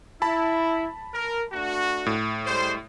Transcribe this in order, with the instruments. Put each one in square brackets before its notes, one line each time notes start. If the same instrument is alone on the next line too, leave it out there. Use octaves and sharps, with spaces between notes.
[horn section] E4 [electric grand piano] A5 B5
[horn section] A#4
A3 D4 F#4
[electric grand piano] A2
[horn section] G3 G#3 C5